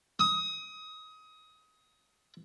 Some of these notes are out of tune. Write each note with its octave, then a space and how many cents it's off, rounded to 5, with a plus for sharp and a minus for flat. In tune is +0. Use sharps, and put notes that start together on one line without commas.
D#6 +25